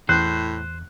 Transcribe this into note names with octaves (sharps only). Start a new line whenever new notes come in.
E2 A2 C5 F#6